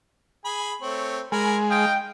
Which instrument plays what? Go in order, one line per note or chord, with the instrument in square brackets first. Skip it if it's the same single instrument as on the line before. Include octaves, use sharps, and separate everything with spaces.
[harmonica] G#4 G#5 B5
A3 C4 C#5
[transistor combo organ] G#3 [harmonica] A#4 G#5 B5
[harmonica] D#4 F5 D#6 [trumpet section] G5